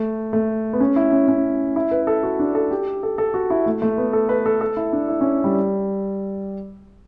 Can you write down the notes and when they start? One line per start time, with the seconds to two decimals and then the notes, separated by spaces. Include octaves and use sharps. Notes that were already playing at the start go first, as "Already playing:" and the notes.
Already playing: A3
0.33 A3
0.73 B3
0.81 C#4
0.96 E4
1.12 C#4
1.28 C#4
1.76 E4
1.91 B4
2.07 A4
2.23 F#4
2.39 D4
2.55 A4
2.71 G4
3.03 A4
3.18 A4
3.34 F#4
3.50 E4
3.66 A3
3.82 A3
3.98 B3
4.13 A4
4.29 B4
4.46 A4
4.61 A4
4.77 E4
4.93 D4
5.08 E4
5.21 C#4
5.44 G3